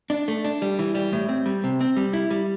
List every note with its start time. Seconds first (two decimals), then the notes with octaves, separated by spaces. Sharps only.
0.10 D4
0.28 A3
0.44 D4
0.62 G3
0.79 E3
0.95 G3
1.13 A2
1.29 C4
1.46 G3
1.64 C3
1.81 C4
1.97 G3
2.13 E4
2.30 G3